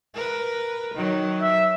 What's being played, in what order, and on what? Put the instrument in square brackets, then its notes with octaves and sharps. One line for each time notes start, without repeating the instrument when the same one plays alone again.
[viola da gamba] A#4 B4
D#3 F#3
[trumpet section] E5